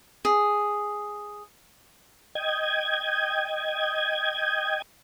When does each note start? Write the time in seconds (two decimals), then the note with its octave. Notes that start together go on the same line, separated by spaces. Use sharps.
0.25 G#4
2.35 D#5 G5 G#6